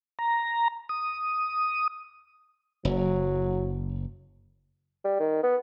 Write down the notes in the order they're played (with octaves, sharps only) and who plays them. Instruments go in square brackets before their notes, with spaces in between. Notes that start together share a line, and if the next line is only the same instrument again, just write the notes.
[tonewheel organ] A#5
D#6
[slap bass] F#1 [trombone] F#3
[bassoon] G3
D#3
B3